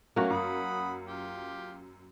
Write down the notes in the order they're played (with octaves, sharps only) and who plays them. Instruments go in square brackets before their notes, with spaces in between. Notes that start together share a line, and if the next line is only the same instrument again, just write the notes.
[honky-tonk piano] F#3 A3 C#4 [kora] A#3 F#4
[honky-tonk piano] F#2 [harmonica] F#5 B5 D#6
[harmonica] F4 G4